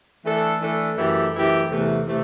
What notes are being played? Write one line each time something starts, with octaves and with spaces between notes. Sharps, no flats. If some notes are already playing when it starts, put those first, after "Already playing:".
E3 A3 D4 A4
E3 A3 D4 A4
F#2 E3 A3 E4 G4
F#2 E3 A3 E4 G4
E2 C3 E3 A3
C3 E3 A3